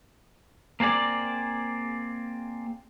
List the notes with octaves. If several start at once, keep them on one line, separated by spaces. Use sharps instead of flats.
A#3 C4 G#4 D5